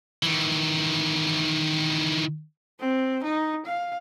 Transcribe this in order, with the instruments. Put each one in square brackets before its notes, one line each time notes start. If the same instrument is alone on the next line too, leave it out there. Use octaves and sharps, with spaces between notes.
[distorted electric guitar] D#3 E3
[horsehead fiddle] C4
D#4
F5